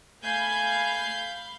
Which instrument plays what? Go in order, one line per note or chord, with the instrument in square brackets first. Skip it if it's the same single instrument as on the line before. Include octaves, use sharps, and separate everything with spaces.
[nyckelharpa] A3 G#5 [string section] F5 B5 G6